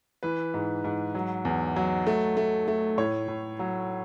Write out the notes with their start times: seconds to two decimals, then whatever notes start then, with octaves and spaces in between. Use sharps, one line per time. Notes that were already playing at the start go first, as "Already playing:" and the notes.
0.23 E3 B4
0.54 G#2
0.84 G#2
1.15 F#3
1.45 E2
1.76 F#3
2.07 A3
2.37 A3
2.68 A3
2.97 A2 C#5
3.28 A2
3.59 F#3